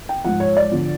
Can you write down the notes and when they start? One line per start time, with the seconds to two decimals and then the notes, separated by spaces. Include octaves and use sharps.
0.09 G5
0.25 G#2 F3 F#5
0.40 C#5
0.57 D5
0.71 D3 F3